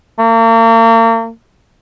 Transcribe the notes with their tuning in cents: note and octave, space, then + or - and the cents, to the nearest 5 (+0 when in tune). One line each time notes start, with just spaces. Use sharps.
A#3 -40